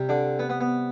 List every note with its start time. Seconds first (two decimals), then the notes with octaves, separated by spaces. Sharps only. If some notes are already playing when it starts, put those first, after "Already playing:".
Already playing: C3 G3
0.09 D3 D4
0.39 B3
0.49 B3
0.61 B3